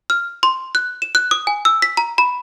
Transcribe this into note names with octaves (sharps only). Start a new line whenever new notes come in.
F6
C6
F#6
E7
F#6
D#6
G#5
E6
B6
A#5
B5